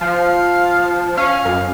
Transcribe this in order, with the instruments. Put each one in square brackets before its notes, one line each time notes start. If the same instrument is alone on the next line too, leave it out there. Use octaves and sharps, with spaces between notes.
[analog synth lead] F3 [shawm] F5
[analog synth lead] C#4 [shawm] F5
[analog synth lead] F#2